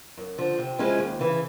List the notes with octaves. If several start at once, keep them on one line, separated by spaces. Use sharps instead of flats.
F#2
D3 F3
C3
F3 G#3 C#4 E4
D#2
C#3 E3